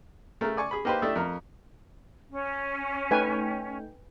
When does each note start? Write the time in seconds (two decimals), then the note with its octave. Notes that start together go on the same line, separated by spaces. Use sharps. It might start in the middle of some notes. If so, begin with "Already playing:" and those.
0.41 C#3 A3 A#4
0.57 D5 G#5 C#6
0.71 G#4 B5
0.85 A#3 D#4 G4 B4 C5
1.02 A3 D4 E4 G4 D#5 E5
1.15 F2 A#4
2.31 C#4
3.11 A3 D#4 B4 G5 G#5